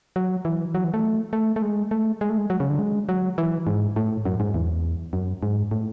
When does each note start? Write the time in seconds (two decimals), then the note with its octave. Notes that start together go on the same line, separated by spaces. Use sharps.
0.16 F#3
0.45 E3
0.75 F#3
0.84 E3
0.94 A3
1.33 A3
1.56 A3
1.62 G#3
1.91 A3
2.21 G#3
2.30 A3
2.38 G#3
2.50 F#3
2.60 C#3
2.70 D3
2.79 G#3
3.09 F#3
3.38 E3
3.67 G#2
3.96 A2
4.25 F#2
4.40 G#2
4.54 E2
5.13 F#2
5.43 G#2
5.71 A2